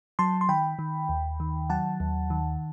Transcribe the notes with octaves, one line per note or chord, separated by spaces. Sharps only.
F#3 A5 C6
C6
D#3 G5 B5
D#3
D#2
D#3
F#3 F#5 A5
D#2
D#3